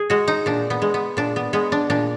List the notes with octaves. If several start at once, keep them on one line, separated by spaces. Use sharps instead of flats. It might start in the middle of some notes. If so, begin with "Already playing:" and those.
Already playing: G#4
G#3 F#4
D#4
A#2 D4
B3
G#3
B3
A#2 D4
B3
G#3 B3
D4
A#2 D4